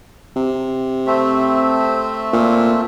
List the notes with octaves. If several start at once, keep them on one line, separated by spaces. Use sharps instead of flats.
C3
A3 C4 E5
A#2